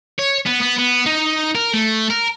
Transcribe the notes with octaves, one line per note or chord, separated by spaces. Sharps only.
C#5
B3
B3
B3
D#4
A#4
A3
A#4